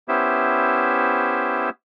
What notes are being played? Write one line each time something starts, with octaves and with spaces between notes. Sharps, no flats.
B3 C#4 E4 G4 C5 E5